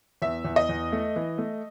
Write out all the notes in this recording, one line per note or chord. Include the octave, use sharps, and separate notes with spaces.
E2 E5
E2
D#5
E2
A3
E3
A3